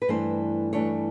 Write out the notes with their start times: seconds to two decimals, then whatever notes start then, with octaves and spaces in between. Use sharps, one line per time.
0.02 B4
0.08 G2 E3 A3 D4 C5
0.73 G2 E3 A3 D4 C#5